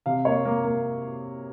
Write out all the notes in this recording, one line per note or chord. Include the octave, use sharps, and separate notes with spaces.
C3 F5
A#3 C#5
A#3
A#3